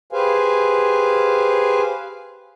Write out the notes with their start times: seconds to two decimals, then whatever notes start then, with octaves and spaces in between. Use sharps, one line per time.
0.12 G4 G#4 B4 C5 F5 G#5